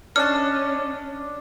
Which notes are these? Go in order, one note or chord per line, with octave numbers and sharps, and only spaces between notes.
C#4 D4 C#5 D#5 A5 F6